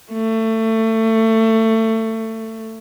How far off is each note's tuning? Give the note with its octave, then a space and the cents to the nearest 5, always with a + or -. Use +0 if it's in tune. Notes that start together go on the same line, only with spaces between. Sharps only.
A3 +25